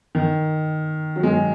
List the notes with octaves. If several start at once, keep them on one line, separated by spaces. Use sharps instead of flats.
D#3
F#3
G#3
F#3